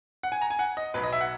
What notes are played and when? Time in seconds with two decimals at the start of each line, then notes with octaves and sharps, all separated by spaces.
0.23 F#5
0.32 G#5
0.42 A#5
0.50 G#5
0.59 F#5
0.77 D#5
0.94 B1 B2 F#3 B4
1.03 D#5
1.13 E5
1.21 F#5